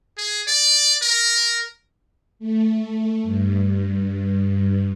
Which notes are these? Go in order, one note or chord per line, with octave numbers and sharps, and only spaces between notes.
G#4
D5
A#4
A3
G2